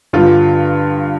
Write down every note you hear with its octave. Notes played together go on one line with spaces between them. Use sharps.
G2 D3 F4